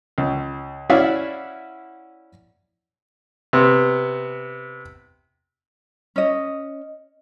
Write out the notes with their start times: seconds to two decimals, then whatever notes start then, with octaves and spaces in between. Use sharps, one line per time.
0.18 C#2
0.90 C#4 E4 F#4 D5 E5 F5
3.53 C3 B3
6.16 C#4 D#5